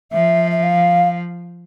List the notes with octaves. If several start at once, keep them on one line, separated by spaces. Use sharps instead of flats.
F3 E5
E5
F5